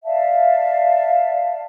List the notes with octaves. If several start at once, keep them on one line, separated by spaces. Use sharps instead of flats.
D5 E5 F5 A5